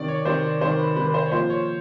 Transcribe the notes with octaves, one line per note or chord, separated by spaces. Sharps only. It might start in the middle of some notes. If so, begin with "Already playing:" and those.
Already playing: C3 D#3 D5
C#5
C3 D#3 C5
C3 D#3 C5
B4
C3 D#3 B4
B4
C5
C#5
A#2 F3 C5
C#5